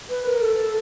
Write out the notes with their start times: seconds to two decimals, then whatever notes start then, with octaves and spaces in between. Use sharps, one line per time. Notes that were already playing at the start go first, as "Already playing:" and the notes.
0.10 B4
0.26 A#4
0.41 A4